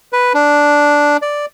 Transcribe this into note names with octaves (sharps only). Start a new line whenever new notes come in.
B4
D4
D5